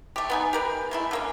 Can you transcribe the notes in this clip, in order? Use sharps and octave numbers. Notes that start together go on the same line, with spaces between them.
A3 G4
B3 D#4 G#5
G4 A#4 B4
G#3 A3 E4
D3 A#3 C#4